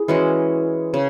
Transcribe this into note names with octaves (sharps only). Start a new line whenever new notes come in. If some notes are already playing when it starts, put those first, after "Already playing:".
Already playing: E4 G#4
E3 G#3 C#4 F#4
C#3